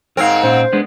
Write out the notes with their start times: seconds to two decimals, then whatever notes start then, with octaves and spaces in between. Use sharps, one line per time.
0.17 G#2 C4 A#4 C#5 F5
0.43 A#2 C#4 C5 F5
0.73 G#3 B3 D4